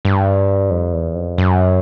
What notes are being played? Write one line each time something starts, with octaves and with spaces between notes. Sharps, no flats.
G2
F2
E2
F2
F#2